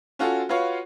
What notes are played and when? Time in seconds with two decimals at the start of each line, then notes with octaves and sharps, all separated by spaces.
0.19 C#4 F4 F#4 A4
0.49 F4 F#4 B4 C#5 F5